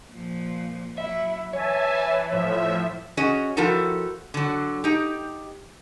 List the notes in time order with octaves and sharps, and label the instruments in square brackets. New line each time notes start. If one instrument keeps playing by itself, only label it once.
[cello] A#2 F3
[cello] F#3 E4 [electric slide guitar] E5
[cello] E3 [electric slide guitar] C#5 [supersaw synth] E5 G#5 A5
[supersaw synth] A2 F3 E5
[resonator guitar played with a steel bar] C#4 F#4 G#4 D#5
F3 E4 F#4 G4 A4 A#4
D3 F#3
D#4 G4